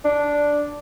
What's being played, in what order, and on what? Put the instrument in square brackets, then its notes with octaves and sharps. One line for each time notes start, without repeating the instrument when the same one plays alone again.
[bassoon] D4